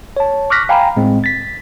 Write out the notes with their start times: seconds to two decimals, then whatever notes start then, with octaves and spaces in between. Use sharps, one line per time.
0.17 C#5 A5
0.50 C#6 D6 F6 F#6 A#6 B6
0.69 F5 G5 G#5 A#5 B5
0.96 A2 G#3 C4
1.24 A6 B6